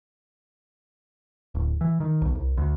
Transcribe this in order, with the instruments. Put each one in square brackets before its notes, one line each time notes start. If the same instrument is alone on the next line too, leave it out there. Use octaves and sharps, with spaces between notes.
[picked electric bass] D1
E3
D#3
B1
C2
D2